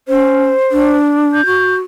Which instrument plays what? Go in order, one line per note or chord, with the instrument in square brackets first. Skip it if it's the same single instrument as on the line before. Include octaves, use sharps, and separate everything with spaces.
[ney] C#4 [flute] C5
[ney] D4
[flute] G6
[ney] F#4